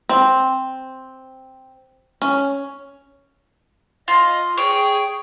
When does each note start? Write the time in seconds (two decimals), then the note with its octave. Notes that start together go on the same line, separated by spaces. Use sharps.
0.09 C4
2.22 C#4
4.08 F4 D#5
4.57 G#4 C#5 G5